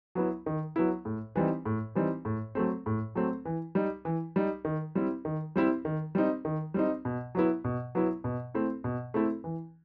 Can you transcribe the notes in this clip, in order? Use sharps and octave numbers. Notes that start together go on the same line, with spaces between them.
F#3 B3 E4
D#3
F#3 B3 E4
A2
E3 G3 C4 D#4
A2
E3 G3 C4 D#4
A2
F#3 A3 C4
A2
F#3 A3 C4
E3
G3 D#4
E3
G3 D#4
D#3
G3 C4 E4
D#3
G3 C4 E4
D#3
G3 C4 D#4
D#3
G3 C4 D#4
B2
F#3 B3 E4
B2
F#3 B3 E4
B2
A3 C4 E4
B2
A3 C4 E4
E3